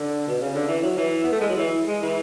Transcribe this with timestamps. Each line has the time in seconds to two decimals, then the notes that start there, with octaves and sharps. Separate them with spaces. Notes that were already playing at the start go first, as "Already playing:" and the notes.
Already playing: D3
0.27 B2
0.41 C#3
0.54 D3
0.67 E3
0.82 F#3
0.97 E3
1.24 B3
1.32 A3
1.41 G#3
1.49 F#3
1.57 E3
1.87 G#3
2.02 E3